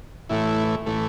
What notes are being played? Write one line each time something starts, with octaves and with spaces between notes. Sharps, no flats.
A2 E3 A3 E4
A2 E3 A3